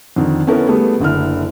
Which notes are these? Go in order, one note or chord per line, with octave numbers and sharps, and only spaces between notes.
F2 D3 D#3
B3 C#4 E4 A4 A#4
G3 A3 B3 G#4
F#1 D3 E4 F6